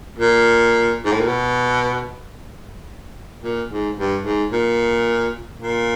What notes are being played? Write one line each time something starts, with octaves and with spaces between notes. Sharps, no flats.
A#2
G#2
A2
A#2
B2
A#2
G#2
G2
G#2
A#2
A#2